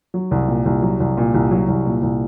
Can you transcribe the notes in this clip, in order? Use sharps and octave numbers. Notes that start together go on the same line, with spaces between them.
F#3
C2
A#2
C2
F#3
C2
A#2
C2
F#3
C2
A#2
C2